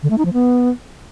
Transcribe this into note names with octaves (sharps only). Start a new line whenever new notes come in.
D3
A3
D#4
F3
B3